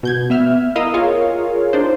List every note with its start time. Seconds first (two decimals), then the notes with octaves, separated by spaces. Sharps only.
0.03 B2 G6 G#6
0.30 B3 E5 F6
0.76 E4 A#4 D#5 F5 D#6 E6
0.94 F4 G#4 A#4 C#5 F5
1.73 D4 D#4 C5